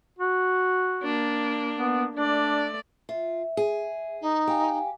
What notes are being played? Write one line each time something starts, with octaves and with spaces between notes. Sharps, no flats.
F#4
A#3 D4
B3
A3 D4 D5
F4 E5
G#4
D#4
G4 F5 G5 G#5